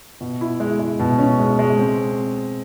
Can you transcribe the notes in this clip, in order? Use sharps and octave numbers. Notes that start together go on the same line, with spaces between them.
B2
E4
G#3
G#3
B2
C#4
G#3
G#3
C4